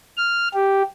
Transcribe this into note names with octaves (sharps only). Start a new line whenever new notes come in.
F6
G4